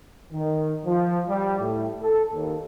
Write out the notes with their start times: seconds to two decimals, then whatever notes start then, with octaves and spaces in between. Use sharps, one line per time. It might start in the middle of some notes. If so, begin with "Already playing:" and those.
0.33 D#3
0.86 F3
1.29 G3
1.59 A2
2.02 A4
2.33 D#2